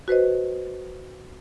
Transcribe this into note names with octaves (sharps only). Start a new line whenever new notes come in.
F#4 B4 C5 D#5